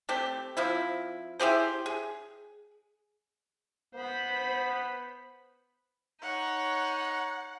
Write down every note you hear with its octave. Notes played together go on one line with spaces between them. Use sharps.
A3 C4 G4
F3 C4 E4
E4 G4 G#4 C5
G#4
B3 C5 B5
D#4 C#5 F#5